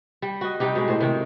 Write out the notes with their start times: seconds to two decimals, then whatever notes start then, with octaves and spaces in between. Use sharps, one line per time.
0.22 G3
0.41 F#4 D#5
0.60 C3 G3 D#4 G4
0.75 B2 G#3
0.88 A2 C5
1.00 C3 D#3 G5